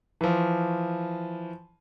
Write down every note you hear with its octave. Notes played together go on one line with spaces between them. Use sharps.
E3 F3